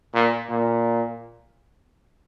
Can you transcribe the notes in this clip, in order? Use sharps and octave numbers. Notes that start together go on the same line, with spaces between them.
A#2
A#2